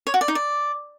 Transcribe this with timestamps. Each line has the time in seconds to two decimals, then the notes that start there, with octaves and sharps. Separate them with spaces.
0.07 C#5
0.14 F#4
0.21 D5
0.28 D#4
0.35 D5